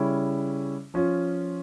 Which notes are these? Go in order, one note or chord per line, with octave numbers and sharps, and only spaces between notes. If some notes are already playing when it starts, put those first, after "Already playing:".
Already playing: C#3 G3 C#4 E4
F3 C#4 F4